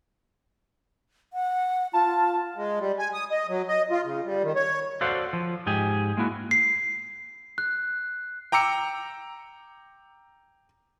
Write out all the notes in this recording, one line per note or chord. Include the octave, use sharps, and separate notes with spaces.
F#5
F4 A5
G#3
G3
G#5
D#6
D#5
F#3
D#5
F4
C#3
G3
D#3
C#5
F#4 A4 C5 D5 F5 F#5
F3
G#2 G4 G#4
G#3 A#3 E4 F#4
C7
F#6
G5 A#5 D6 E6 C#7